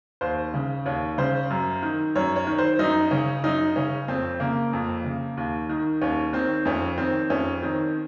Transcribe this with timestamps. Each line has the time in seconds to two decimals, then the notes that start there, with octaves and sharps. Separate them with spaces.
0.21 D#2 C5
0.54 C#3
0.86 D#2 C#5
1.18 C#3 C5
1.50 F#2
1.83 D#3
2.15 F#2 C#5
2.36 C#5
2.47 D#3
2.58 C5
2.79 F#2 D#4
3.11 C#3 C#4
3.44 F#2 D#4
3.76 C#3 C#4
4.08 F2 C4
4.40 C#3 A#3
4.73 F2
5.04 C#3
5.37 D#2
5.69 D#3
6.02 D#2 C#4
6.33 D#3 C4
6.65 F2 C#4
6.98 D#3 C4
7.30 F2 C#4
7.62 D#3 C4